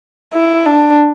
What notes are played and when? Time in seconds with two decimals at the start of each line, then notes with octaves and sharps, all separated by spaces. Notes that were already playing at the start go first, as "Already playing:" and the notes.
0.33 E4
0.66 D4